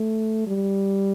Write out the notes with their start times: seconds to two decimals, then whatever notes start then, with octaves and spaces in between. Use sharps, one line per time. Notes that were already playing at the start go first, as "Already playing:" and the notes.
Already playing: A3
0.47 G3